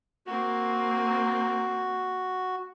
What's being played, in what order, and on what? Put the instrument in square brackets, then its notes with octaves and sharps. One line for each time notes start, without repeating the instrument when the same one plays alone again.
[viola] A#3 C4 [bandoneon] F#4